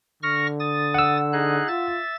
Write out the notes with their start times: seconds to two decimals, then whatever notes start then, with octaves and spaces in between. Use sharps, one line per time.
0.23 D3 C#6 F6 A#6
0.60 D#6 A6
0.94 F#5 E6
1.33 D#4 G#4 F#6
1.68 F4 E5 A6